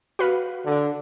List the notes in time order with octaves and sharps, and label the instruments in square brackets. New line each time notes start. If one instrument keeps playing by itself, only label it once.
[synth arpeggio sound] F#4 B4 F5
[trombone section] D3